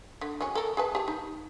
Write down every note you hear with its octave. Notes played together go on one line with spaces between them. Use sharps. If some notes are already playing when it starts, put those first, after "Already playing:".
D3
F#3 G#3 C#4
A4 A#4
G#4 B4 A5
G4 A5
D#4